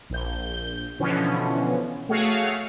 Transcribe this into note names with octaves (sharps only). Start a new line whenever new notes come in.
A#1 G6
B2 D3 E3 F3 B3 C#4
A3 F#4 G#4 C#5 F5